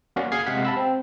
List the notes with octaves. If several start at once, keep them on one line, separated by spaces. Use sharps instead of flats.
A#3 C#4 F#4 D5 F5 F#5
G#4 F5 G#6 C7
C3 G#3 F5 F#5 F#6 B6
A5 B5 E6
C4